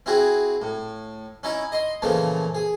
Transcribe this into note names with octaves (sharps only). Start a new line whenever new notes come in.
C4 E4 F#4 G#4
A2
C#4 D#4 E4
D#5 C6
A#2 C#3 E3 F3 A3
G#4